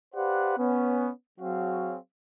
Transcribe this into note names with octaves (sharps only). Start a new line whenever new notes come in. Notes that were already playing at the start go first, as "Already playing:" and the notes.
G4 B4 C5 D5 F5 F#5
B3 C#4
F#3 C4 F#4 G#4 C#5 F5